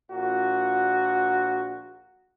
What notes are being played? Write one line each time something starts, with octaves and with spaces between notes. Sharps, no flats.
A#1 A#2 F#4